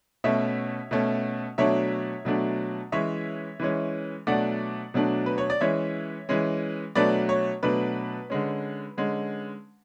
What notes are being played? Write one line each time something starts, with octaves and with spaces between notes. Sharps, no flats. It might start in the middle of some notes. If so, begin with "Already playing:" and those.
B2 A3 C#4 C#5 E5
B2 A3 C#4
B2 F#3 A3 D4 C#5 E5
B2 F#3 A3 D4
E3 G#3 C#4 C#5 E5
E3 G#3 C#4
B2 F#3 A3 D4 D5 F#5
B2 F#3 A3 D4
B4
C#5
D5
E3 G#3 C#4 C#5 E5
E3 G#3 C#4
B2 F#3 A3 D4 B4 D5
C#5
B2 F#3 A3 D4 B4
D3 G#3 C#4
D3 G#3 C#4